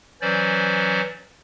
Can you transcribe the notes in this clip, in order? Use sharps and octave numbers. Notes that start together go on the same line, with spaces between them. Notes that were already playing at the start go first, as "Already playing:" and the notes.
E3 F#3 C#4 C5 D5